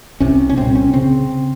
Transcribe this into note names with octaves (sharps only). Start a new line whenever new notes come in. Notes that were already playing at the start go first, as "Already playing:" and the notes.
C2 C3 C#4
C#4
C2 A#2 C4
C#4
C#3 C4